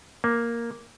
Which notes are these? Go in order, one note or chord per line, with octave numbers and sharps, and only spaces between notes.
A#3